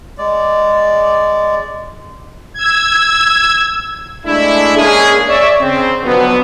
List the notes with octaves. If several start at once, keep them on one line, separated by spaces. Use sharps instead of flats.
G#3 D5
E6 G#6
G#3 A3 D4 E4
G#3 A#3 C#4 D4 G#4
C#5 D5 E5
C#3 C4
B2 D3 F3 F#3 B3